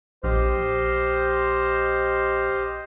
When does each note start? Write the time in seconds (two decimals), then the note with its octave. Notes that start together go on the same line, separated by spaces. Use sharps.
0.24 A#1 G4 C5 D#5 F6